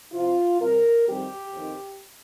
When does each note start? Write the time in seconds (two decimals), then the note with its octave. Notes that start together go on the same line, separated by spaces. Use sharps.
0.11 C3 F3 C4 F4
0.59 C3 G3 C4 A#4
1.06 F2 D#3 G3 C4 G4
1.53 F2 D#3 C4